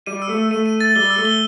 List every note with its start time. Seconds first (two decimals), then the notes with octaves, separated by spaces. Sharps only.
0.06 G3 D#7
0.22 E6
0.29 A3
0.37 D#7
0.51 A3 D#7
0.66 D#7
0.81 A6
0.96 G3 G7
1.10 E6
1.18 A3
1.25 G7